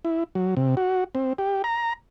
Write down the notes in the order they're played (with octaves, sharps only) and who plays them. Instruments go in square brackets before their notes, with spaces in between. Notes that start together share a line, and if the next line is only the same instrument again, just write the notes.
[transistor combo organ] E4
F#3
C3
F#4
C4
G4
A#5